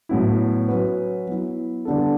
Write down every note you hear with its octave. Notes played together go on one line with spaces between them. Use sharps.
A2 F#3 B3 E4
F#3 C#4 F#4 B4
F#3 B3 E4
D3 G3 B3 D4 A4